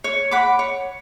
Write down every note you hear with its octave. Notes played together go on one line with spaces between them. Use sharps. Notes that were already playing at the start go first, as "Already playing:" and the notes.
C#5
F#5 B5 D6
C#5